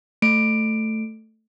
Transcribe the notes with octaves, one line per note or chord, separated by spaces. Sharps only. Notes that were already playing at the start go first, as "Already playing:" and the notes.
A3 D7